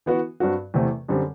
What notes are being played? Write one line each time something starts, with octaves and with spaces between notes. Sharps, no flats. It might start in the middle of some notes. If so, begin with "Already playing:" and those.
E3 B3 F#4
G2 F#3 C4 F#4
E2 C3 E3 A3 C4
F#2 D3 G3 C4